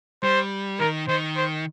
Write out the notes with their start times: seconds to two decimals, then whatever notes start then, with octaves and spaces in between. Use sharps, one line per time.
0.23 G3 C5
0.80 D#3 A#4
1.08 D#3 C5
1.37 C5